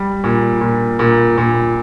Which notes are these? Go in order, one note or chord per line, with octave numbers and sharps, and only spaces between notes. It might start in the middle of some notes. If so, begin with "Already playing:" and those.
Already playing: G3
A#2
A#2
A#2
A#2